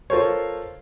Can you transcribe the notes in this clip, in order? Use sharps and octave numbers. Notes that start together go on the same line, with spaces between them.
F4 A4 A#4 C5 C#5